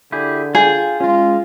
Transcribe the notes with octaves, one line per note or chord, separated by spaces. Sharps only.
D3 E4 G4 G#4
F4 G#4 G5
G#3 C#4 F4